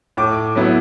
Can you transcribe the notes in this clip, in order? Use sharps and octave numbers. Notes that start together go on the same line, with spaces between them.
A2 D6
F#3 B3 E4